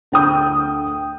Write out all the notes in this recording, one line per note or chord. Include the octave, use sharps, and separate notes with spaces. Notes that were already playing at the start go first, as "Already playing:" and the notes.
D2 G5 D#6 G6